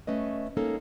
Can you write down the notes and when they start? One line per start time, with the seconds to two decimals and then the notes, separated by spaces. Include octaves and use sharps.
0.07 A3 C#4 B4 D#5
0.57 G#3 A#3 C#4 D#4 A4